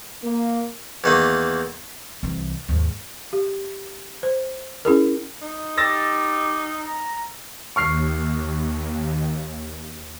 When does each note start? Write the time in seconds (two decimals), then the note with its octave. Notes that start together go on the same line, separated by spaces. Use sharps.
0.24 A#3
1.04 E2 D#3 A#3
2.23 C2 E3
2.69 D#2 G#2
3.33 G4
4.23 C5
4.85 C#4 E4 G#4 A#4
5.42 D#4
5.78 G4 E6 A6 A#6
6.80 A#5
7.76 D#2 C#6 F6 C7